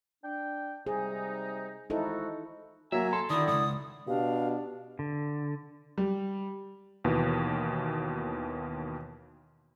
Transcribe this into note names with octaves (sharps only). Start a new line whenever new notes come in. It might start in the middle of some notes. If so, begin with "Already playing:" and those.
D4 G5
C3 G3 D#4 G#4
F3 G#3 D#4 E4 F#4 A4
F#3 A#3 E5 G#5 A#5
A4 C6
D3 D#3 E4 D5 D#6
C#2 G2 D#6
B2 D4 G4 F5
D3
G3
D#2 B2 E3